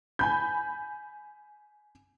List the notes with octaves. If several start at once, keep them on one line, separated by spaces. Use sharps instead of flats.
G#5 B5 G6